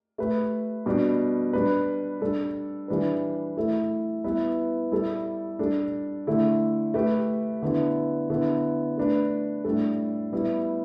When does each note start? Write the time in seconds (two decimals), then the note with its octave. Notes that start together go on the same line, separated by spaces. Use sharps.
0.18 A3 G4 B4
0.86 B2 G3 D4 G4
1.53 G3 D4 B4
2.21 G3 D4 A4
2.88 E3 G3 D4 B4
3.57 A3 E4 A4
4.24 G3 B3 E4 B4
4.92 G3 E4 A4
5.59 G3 D4 A4
6.27 D3 A3 E4
6.94 A3 G4 B4
7.62 D3 B3 E4
8.30 D3 B3 E4
8.97 A3 D4 B4
9.65 A2 G3 D4 A4
10.33 G3 B3 E4